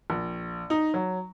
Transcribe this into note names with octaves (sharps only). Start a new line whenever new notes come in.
A#1
D#4
F#3